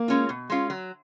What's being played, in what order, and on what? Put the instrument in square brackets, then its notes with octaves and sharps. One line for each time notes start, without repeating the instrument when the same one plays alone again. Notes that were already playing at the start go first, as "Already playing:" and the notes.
Already playing: [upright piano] A#3
[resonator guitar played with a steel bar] G#3 C#4 F4
B2
G#3 C#4 F4
F#3